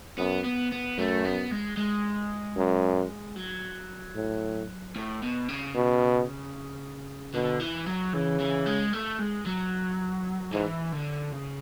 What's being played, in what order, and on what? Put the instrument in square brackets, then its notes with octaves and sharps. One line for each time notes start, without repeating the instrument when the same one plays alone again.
[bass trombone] F#2 [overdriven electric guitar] B3
[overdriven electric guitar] B3
B3
[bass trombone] F#2 [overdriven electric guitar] A3
[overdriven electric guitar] B3
G#3
G#3
[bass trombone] F#2
[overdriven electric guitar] F#3
[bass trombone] A2
[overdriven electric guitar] A2
B2
C#3
[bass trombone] B2
[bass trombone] B2 [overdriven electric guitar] D3
[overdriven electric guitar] E3
F#3
[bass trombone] C#3 [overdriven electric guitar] E3
[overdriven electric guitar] E3
G#3
A3
G#3
F#3
[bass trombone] G#2 [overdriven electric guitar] E3
[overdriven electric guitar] D3
C#3